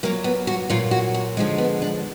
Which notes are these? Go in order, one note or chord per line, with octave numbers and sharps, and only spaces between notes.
A#2 F#3 A#3
B3
F#4
A#2 F#3 F4
F#4
F#4
D3 F3 G#3
B3
D4